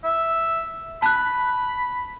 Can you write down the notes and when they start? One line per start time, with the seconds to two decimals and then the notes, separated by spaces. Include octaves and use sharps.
0.04 E5
1.02 A5 B5 F#6